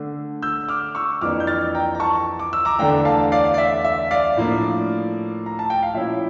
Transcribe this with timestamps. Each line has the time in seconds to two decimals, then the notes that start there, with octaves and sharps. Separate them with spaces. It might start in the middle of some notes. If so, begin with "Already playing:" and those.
Already playing: D3 A3 D4
0.42 E6 G6
0.69 D6 F6
0.95 C#6 E6
1.21 F2 E3 A#3 D4 D6 F6
1.40 G6
1.47 F6 A6
1.75 G5 A#5
1.95 A#5
2.00 A5 C#6
2.39 D6
2.53 E6
2.65 A#5 D6
2.79 E2 D3 A3 D4 G5 A#5
3.05 F5 A5
3.32 D5 F5
3.54 D5
3.58 E5
3.85 E5
4.11 D5 F5
4.37 A2 F3 A#3 D4
5.46 A#5
5.59 A5
5.70 G5
5.83 F5
5.94 A#2 F3 C#4 E4 E5